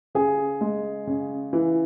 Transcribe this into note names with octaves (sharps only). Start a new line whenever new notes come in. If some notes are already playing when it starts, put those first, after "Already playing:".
C#3 G#4
G#3
C#3
E3